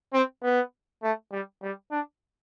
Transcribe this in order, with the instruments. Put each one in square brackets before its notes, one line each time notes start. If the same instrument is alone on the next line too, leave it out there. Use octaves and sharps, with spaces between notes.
[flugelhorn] C4
B3
A3
G3
G3
D4